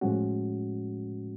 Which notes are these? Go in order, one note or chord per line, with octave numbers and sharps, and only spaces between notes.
A2 F3 G#3 C#4 F#4